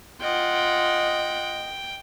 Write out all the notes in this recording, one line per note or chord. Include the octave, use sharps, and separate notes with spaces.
F4 D#5 F#5 G5